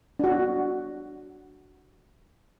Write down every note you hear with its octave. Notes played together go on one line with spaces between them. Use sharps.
D4 F#4